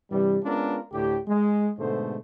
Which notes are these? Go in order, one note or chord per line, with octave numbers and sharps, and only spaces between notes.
G2 C3 E3 G3
G#3 B3 C#4 D4 F4 A#4
D2 A2 D3 G4
G#3
G#2 B2 D3 G#3 A3 C5